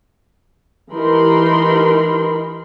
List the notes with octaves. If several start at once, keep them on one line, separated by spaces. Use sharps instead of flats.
E3 D#4 G4 A#4 B5 C6